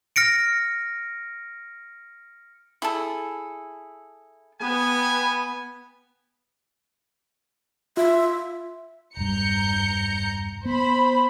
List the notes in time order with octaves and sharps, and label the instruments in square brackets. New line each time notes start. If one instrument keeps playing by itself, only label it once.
[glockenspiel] F6 A#6 C#7 D7
[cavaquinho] E4 G#4 A4
[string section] B3 [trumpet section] G5 G#5
[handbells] F4 [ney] E5
[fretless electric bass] E1 G2 [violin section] A#5 G6 C#7
[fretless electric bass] B3 [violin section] C5 B5